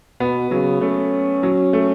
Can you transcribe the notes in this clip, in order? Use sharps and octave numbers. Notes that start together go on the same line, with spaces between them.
B2 B3
C#3 F#3
A3 C#4
F#3
A3